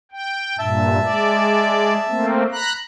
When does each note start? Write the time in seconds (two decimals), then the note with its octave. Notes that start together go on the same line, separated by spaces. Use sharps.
0.12 G5
0.59 G2 A#2 E5 A5
1.03 G#3 D5
2.09 A3 A#3 C4
2.52 A#5 B5 F#6